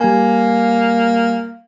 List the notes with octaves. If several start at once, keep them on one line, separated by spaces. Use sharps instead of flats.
G3 A#3 G#5